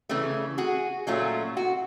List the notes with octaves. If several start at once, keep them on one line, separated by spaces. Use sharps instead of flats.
C#3 E3 A3
F#4 G#4
A#2 F#3 A3 C#4 F4
F#4